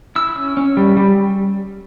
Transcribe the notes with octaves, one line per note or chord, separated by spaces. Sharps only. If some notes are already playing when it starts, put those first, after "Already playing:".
E4 E6
C#4
C#4
G3
G3